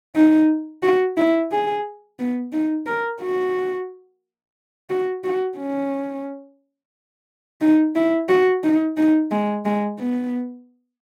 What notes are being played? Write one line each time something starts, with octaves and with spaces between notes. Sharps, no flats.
D#4
F#4
E4
G#4
B3
D#4
A#4
F#4
F#4
F#4
C#4
D#4
E4
F#4
D#4
D#4
G#3
G#3
B3